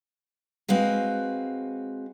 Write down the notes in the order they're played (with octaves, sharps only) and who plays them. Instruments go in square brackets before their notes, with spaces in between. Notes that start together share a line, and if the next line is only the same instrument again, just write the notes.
[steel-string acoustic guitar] G#3 C4 F#4 B4 F5